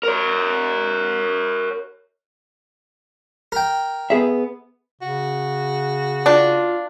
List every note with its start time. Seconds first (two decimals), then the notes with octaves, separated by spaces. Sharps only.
0.03 A#4 C#5
3.52 A#4 G5
4.10 B3 G#4 E5
5.02 C#3 F#4
6.26 D4 F4